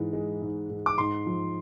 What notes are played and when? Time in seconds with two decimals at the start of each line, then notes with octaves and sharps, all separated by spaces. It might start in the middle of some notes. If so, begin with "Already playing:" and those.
Already playing: G#2 E3 G#3
0.13 G#3
0.42 G#2
0.70 G#2
0.86 D6
0.98 G#2 C6
1.26 F3